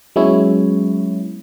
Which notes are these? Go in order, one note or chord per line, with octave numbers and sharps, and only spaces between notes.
F#3 G#3 B3 C#4 E4 C#5